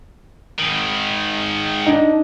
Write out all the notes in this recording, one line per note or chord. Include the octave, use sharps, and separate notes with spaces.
G#2 D#3
D4 D#4